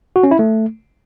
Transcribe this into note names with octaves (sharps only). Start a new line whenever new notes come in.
F#4
C#4
E4
A3